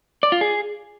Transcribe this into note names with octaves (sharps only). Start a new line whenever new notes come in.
D5
F4
G#4